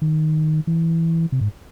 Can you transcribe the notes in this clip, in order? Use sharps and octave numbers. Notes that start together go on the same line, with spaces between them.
D#3
E3
C3
G#2